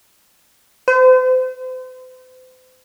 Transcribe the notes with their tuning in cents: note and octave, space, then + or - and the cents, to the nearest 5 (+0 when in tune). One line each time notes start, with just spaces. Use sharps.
C5 -40